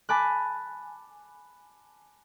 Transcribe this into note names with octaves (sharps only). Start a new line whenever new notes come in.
G#5 A5 B5 D6 F#6